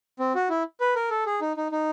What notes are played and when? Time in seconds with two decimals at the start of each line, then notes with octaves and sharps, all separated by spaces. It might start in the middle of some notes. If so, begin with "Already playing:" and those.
0.19 C4
0.35 F#4
0.49 E4
0.80 B4
0.96 A#4
1.10 A4
1.26 G#4
1.41 D#4
1.57 D#4
1.72 D#4